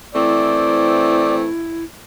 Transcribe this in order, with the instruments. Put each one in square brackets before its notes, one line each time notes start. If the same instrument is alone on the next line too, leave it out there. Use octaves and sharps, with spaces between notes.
[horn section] E3 A3 C4 [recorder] E4 [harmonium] D5